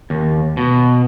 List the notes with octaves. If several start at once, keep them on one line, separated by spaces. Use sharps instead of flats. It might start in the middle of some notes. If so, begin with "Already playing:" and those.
D#2
B2